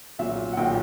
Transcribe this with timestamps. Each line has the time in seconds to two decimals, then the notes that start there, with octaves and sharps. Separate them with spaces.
0.19 B1 A#2 F#3 E5
0.53 F#5
0.57 B1 A#2 F#3 G5